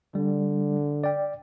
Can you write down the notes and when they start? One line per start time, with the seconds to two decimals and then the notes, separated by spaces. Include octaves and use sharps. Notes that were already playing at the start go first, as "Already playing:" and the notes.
0.15 D3 G3
1.04 D5 G5